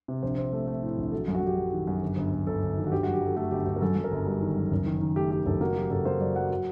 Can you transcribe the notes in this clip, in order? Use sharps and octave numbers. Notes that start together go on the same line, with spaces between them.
C3
A#1 C5
C4
A3
A3
A2
A#1
F#3 A4
F#2
F#4
F#2 G4
F#3
D#3
F#2
G1
G1
G1
G1 A4
G1
D#3
F#4
G1 G4
F#4
F#2
G4
F#3 A4
A3 G4
G1 G4
G1 G4
A#4
F#2 A4
F#2
A#4
G1
G3
D#3
F#2
F#1
D#3
D#3
A3 G4
A3 G4
F#1 A4
A#3 F#4
F#3 G4
F#1 A4
A#3 C5
F#2 D5
F#3 F#5
F#3